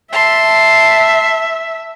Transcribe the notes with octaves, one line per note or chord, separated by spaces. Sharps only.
E5 A5 C6